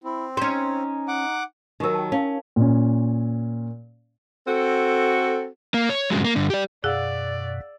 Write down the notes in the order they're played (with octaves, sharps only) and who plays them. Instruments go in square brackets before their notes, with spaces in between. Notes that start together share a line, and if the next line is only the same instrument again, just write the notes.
[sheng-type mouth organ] C4 [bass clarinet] E4
[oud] C#4 C5 [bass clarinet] D#4
[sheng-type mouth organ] F#5 D6
[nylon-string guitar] D#3 F#3 [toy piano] D#4 G4 A#4
[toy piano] G5 A5
[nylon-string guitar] C#4 [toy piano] E4 F5 A5
[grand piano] A#2 C#4
[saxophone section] C4 F#4 A4
[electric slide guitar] A#3
C#5
G2 C#3 E3 F#3 G#3
A#3
G2 D3
G4 D5
[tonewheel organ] F#2 B2 [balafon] G#4 [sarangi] D5 [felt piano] F5 F#5 E6